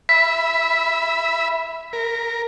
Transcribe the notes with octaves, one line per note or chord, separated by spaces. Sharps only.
E5 B5 B6
A#4